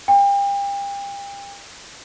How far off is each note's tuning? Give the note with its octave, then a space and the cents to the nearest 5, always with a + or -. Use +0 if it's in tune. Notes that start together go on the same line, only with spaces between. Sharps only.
G5 +35